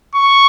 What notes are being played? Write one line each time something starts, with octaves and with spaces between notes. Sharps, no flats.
C#6